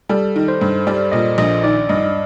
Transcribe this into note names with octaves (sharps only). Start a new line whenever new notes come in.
G3 A4
D#3
C5
G2
G3 D5
A#2 D#5
A#1 D#5
D#3 D5
G2 D#5